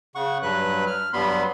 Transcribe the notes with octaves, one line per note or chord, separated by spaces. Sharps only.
C#3 F#5 C#6
G2 F#3 B4 F#6
F6
G2 F#3 G3 B3 B5 C6